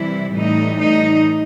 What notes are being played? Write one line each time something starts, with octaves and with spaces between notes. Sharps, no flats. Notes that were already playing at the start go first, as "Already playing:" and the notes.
Already playing: C3 E3 G3 E4
A2 E3 G3 D#4
D#4